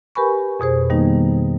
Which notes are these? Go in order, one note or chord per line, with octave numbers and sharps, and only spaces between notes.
G4 A#4 B4 G#5 B5 C#6
F2 B2 G#4 C5
D#3 G3 A#3 B3 D#4